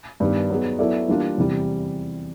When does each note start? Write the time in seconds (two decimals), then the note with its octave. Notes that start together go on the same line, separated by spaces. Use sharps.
0.20 G2 D#3 G3 B3
0.50 F#3 B3 D#4 G#4
0.79 F#3 B3 E4 A4 D5
1.08 E3 G3 A#3 D4 F4
1.37 E2 C3 E3 G3